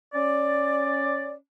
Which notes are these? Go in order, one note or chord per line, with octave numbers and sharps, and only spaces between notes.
C#4 D5